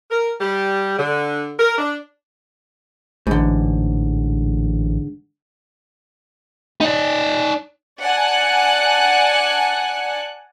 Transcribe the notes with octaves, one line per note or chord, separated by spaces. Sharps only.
A#4
G3
D3
A#4
D4
A1 G#2 D3
D#4 D5
D5 F#5 G#5 A5 F#6